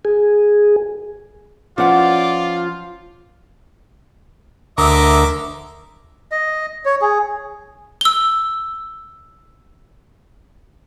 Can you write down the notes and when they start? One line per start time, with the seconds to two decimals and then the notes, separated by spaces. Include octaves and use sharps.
0.05 G#4
1.78 F3 C#4 F4 B4 D5 F#5
4.78 D2 A#4 D#5 E5 D6
6.32 D#5
6.85 C#5
7.01 G#4
8.01 E6 G7